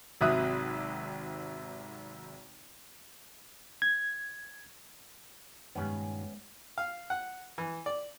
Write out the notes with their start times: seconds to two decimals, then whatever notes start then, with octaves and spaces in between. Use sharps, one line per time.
0.21 G#1 C3 F#3 E5 D#6 F#6
3.82 G#6
5.75 G2 A#2 D#3 G#3 B3 C#4
6.78 F5
7.10 F#5
7.58 E3
7.86 D5